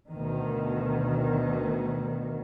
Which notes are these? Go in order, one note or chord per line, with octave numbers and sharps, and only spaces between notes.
D2 B2 D#3